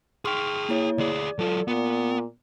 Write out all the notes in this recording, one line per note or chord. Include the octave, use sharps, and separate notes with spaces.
G#4 G5 C6 C#6 F6
A#3 E4 C#5
D2 G#4 D5
F#3 F4 A4
A#2 B3